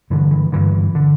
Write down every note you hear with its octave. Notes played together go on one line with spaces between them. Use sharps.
G2 D3 E3
E3
G2 D3 E3
D3